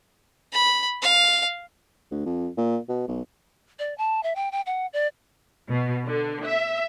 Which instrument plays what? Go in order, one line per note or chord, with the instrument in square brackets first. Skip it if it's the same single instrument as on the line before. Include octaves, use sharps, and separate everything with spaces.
[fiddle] B5
F5
[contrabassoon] D2
F2
A#2
B2
B1
[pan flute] D5
A5
E5
G5
G5
F#5
D5
[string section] B2
D3
E5